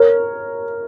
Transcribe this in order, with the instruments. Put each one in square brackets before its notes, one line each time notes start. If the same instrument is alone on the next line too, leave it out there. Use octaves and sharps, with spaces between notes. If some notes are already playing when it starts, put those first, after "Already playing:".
Already playing: [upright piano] A#4 C#5